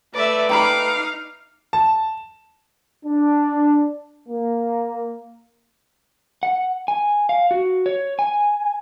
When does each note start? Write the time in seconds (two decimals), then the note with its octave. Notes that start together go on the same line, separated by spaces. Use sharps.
0.14 A3 B4 D5 E5
0.49 D#4 F5 G5 A#5 B5 D6
1.73 A5
3.05 D4
4.28 A#3
6.43 F#5
6.88 G#5
7.29 F5
7.51 F#4
7.86 C#5
8.19 G#5